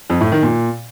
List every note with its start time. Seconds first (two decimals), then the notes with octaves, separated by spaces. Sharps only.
0.10 F2
0.21 A2
0.32 D#3
0.43 A#2